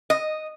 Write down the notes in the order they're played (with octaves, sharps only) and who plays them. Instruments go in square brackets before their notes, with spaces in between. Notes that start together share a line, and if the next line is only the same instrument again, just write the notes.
[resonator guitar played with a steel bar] D#5